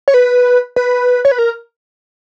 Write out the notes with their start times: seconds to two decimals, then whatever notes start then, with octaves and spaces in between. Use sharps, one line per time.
0.08 C#5
0.14 B4
0.76 B4
1.25 C#5
1.31 B4
1.38 A#4